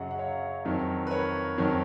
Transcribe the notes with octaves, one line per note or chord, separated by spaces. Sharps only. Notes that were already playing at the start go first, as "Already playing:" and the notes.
Already playing: F#2 C#3 F#3 D#5 F#5
F#5
C#5 F5
F2 D#3 F#3
B4
A#4 C#5
F2 D#3 F#3